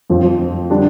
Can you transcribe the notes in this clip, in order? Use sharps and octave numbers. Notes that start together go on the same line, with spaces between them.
F2 F3 C4
D3 G3 D4